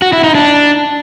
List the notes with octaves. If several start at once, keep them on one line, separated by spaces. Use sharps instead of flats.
F#4
E4
D#4
D4